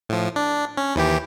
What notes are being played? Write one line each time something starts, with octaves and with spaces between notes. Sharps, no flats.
A2 F3
D4
C#4
D#2 E3 G4